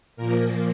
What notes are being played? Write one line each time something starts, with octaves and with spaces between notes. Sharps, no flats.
A#2 F3 A#3 A#4